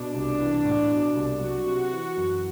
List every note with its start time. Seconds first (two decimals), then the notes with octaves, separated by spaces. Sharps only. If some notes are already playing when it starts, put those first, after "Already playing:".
Already playing: B2 D4
0.14 C2
0.40 E3
0.65 A2
0.91 B2
1.15 C2
1.41 F#3 F#4
1.66 C3
1.92 E3
2.17 F#2